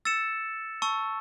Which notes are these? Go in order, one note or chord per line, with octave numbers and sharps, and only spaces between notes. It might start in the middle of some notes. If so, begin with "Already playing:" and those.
E6 A6 C#7 E7
A5 C#6 E6